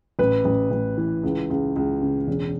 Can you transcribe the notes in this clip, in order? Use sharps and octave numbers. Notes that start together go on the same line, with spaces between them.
A1 B4
A1
A1
E3
C#2
C#2
C#2
C#3
E1